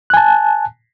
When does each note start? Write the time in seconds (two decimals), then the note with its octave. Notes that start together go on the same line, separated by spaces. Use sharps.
0.10 F#6
0.14 G#5
0.17 A5